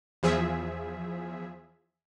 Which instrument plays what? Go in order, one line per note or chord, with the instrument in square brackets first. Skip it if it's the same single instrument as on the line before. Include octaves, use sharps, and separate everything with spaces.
[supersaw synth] E2 F3 G#4 E5